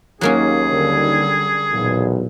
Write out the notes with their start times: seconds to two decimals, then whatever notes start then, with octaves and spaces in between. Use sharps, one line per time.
0.21 D#2 F#3 A#3 C#4 G#4
0.69 D3 G3
1.71 B1 E2 A#2